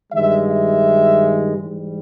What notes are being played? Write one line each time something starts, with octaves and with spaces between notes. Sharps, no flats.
G2 D#3 G#3 E5
E5
G#2 E3 G3